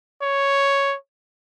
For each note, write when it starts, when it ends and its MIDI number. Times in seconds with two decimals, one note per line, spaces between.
0.22 0.96 73